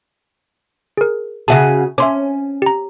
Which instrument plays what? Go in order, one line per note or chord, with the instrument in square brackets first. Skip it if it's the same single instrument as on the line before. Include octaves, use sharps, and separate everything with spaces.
[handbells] G#4 A#4
[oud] C#3 F#4 G#4 [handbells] E5 A5
[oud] C#4 [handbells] E5 C6 D6
[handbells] G4 A#5